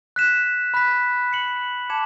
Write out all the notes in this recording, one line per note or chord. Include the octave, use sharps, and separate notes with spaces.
F#6 B6 E7
B5 F#6 B6
F#6 C#7 F#7
A5 D6 G#6 C#7 E7